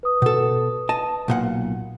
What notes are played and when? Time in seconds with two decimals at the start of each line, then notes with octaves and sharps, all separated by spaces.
0.03 B4 D#6
0.22 B2 A4
0.89 D#5 A5
1.28 B1 A#2 F#5